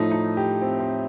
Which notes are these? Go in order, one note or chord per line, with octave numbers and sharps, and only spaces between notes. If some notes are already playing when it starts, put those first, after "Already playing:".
Already playing: A2 F3 A3 D#4
D#4
G4
C4
C4